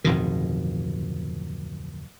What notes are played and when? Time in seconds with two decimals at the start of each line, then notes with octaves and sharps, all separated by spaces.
0.04 D1 F2 B2 D#3